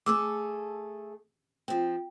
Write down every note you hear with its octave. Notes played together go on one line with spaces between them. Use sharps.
A3 G#4 A4 D6 E6
F3 C4 G5